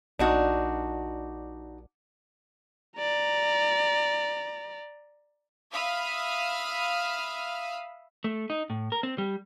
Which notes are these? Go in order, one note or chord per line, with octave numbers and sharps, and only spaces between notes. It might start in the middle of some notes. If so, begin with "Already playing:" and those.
A#1 D4 D#4 F#4
D5 A#5
E5 F5 B5 D#6 F6
A3
D#4
A2
A#4
C4
G3